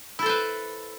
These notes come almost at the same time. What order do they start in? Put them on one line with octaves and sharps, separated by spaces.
E4 A4 C5 B4